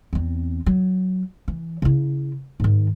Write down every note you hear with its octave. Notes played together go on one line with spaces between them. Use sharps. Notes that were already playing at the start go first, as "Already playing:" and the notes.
E2 C4
F#3
E3
C#3 E4
G#2 D#3